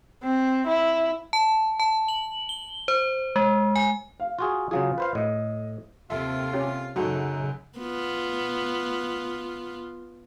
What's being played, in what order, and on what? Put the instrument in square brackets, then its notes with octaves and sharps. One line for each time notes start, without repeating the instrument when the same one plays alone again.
[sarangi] C4
E4
[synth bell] A5
A5
F#7
G7
C5
G#3
G#5
[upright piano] F5
[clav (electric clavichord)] F4 F#4 G#4
[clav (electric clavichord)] C#3 F#3 G#4 [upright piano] F4
[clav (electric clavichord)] B4 C5 F5
[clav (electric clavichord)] A2 [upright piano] D#5
[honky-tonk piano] D#2 A4 E5 [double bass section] C3 [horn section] F4
[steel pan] C#4 G4
[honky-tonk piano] F#2 D#4 F#5 [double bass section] C#3 [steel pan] F#4 A4
[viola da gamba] B3 F4